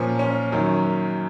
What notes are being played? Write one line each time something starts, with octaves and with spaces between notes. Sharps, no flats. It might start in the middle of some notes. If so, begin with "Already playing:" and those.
Already playing: A#2 F3 C#4
C#4
F#2 D#3 F#3